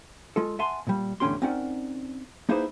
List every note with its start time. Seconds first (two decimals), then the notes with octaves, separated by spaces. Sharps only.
0.36 G#3 F4 A4
0.59 E5 F#5 G#5 A5 C6
0.87 A#2 G3
1.20 E2 A2 D3 C#4 G4 C6
1.42 C4 C#4 D#4 A#4 D5 F#5
2.49 A#3 D#4 E4 G#4 B4 C5